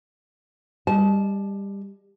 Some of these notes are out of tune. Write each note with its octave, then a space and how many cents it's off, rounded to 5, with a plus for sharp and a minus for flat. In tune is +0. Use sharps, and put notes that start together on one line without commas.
G3 +20 D#5 +0 A5 -25